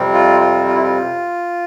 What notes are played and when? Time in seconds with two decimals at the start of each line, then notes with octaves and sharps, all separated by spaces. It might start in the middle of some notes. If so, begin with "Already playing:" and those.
Already playing: F2 C3 G3 C4
0.14 F4
0.40 F4
0.67 F4
0.75 E4
0.83 F4